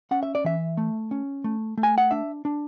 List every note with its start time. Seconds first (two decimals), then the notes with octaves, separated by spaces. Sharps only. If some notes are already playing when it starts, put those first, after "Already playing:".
0.11 C#4 F#5
0.23 E5
0.35 D5
0.45 E3 E5
0.77 A3
1.11 C#4
1.44 A3
1.77 A3
1.83 G#5
1.98 F#5
2.11 D4 E5
2.45 D4